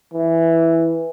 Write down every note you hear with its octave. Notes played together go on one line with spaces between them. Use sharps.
E3